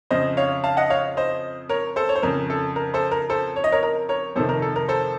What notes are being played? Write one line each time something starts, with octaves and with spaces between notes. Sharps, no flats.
F2 C#3 C5 D#5
C#5 F5
F5 A5
D#5 F#5
C#5 F5
C5 D#5
A#4 C#5
A4 C5
C#5
C5
F2 C#3 A#4
A4
A#4
A4 C5
A#4
A4 C5
C#5
D#5
A#4 C#5
A#4
A#4 C#5
F2 C3 D#3 A4 C5
A#4
A4
A#4
A4 C5